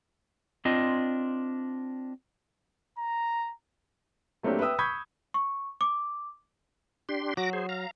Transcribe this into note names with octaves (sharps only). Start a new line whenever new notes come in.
C4 D4 F4 D#5
A#5
F#3 A3 A#3 C4 D4 G4
B4 E5 G5 D#6 E6
B5 C#6 D#6 G6 G#6 B6
C#6
D6
D4 G4 C6
F#3 F#4 D6 A#6
G#4 C5
F5 A#5